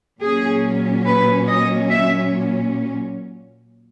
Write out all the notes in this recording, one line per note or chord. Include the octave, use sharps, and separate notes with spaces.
A#2 F#3 C#4 G#4
B4
D#5
E5